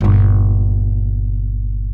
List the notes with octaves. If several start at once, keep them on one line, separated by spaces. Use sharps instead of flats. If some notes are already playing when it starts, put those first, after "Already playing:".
G1 A#2